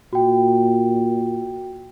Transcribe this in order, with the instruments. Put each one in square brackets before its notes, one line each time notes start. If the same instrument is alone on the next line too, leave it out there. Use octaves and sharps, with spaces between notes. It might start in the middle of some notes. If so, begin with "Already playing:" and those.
[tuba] A#2 [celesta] F#4 G5